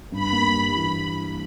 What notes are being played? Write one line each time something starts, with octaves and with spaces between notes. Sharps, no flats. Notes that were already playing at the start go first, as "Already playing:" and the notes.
G2 B5
A#3
G3
E3